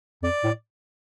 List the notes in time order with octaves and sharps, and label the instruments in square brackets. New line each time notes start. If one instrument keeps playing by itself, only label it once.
[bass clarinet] F2 [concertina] D5
[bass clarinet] A2